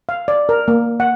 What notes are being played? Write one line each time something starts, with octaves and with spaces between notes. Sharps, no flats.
F5
D5
A#4
A#3
F#5